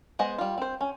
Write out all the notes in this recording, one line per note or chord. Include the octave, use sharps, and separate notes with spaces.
G#3 B3 G#4 C5 D#5
G3 F4
C4 C5
C#4